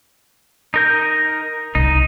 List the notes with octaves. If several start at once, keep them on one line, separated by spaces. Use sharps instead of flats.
D#4 A#4 G6
C2 D#4